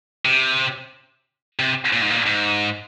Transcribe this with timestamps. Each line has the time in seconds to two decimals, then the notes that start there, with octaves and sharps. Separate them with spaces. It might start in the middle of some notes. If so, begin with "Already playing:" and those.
0.25 C3
1.59 C3
1.93 A#2
2.02 G#2
2.10 A#2
2.26 G#2